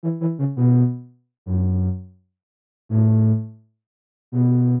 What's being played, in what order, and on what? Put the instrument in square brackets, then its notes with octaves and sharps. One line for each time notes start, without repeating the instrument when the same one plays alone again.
[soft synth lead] E3
E3
C#3
B2
F#2
A2
B2